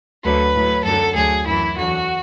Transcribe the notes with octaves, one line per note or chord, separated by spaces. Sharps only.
D2 D3 F#3 B4
A2 F#3
F#2 D3 F#3 A4
D2 D3 F#3 G#4
F#2 E3 E4
E2 D3 F#3 F#4